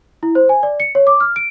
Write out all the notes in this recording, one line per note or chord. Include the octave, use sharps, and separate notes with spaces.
E4
C5
G#5
D5
C#7
C#5
D6
F6
D7